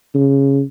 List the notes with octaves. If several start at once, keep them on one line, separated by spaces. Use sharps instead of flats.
C#3